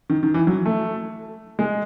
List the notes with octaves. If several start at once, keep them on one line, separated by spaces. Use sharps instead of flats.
D#3
D#3
E3
F#3
A3
G#3